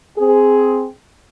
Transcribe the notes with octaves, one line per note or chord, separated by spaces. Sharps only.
C4 G#4